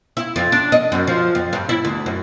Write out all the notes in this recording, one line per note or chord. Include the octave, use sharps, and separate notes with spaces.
E4
F2
D4
D#5
F#2
F3
F2
G2
E4
D2
F#2